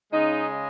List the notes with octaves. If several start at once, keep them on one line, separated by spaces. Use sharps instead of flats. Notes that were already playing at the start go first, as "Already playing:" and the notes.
C#3 G#3 D#4